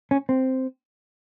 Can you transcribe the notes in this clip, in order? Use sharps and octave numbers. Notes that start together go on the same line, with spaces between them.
C#4
C4